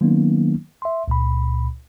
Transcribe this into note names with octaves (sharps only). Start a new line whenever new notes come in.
D#3 F#3 A#3 B3 C#4 D#4
E5 C6
C#2 A#2 B5